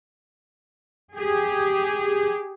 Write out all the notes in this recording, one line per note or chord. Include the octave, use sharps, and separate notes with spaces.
G4 G#4